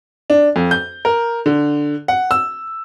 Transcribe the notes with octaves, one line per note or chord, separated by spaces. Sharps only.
D4
F2
G6
A#4
D3
F#5
E6